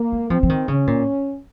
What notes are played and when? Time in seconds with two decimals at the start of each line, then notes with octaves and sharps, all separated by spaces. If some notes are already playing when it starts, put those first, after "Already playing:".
Already playing: A#3
0.12 G#3
0.30 F3 C4
0.43 F3
0.49 D#3
0.68 C#3 C#4
0.87 A#2